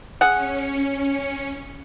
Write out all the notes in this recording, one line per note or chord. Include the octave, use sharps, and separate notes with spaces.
C#4 G#4 F#5 C#7